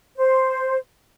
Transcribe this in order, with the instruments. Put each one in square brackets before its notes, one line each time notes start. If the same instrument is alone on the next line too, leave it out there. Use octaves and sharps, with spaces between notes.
[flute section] C5